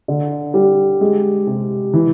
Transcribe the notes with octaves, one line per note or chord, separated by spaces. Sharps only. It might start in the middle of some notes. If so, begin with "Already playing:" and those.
D3
G3
G#3
C3
E3